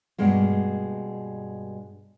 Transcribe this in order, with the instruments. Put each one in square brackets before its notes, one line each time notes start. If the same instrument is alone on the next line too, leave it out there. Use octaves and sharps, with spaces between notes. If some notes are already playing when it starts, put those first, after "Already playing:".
[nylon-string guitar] G2 B2 G#3 A#3